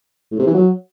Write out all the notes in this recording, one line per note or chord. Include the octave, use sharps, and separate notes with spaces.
A2
C3
E3
F#3